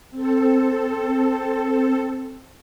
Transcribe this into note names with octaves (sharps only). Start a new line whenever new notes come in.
C4 A4